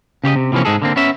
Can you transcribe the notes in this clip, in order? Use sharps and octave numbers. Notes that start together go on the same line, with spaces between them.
C#3 G4 C#5 D#5
C3
C3 E3 F3 A#3 C#4
G#2 G#3 G#4 A4
D3 A#3 C4
B3 C#4 E5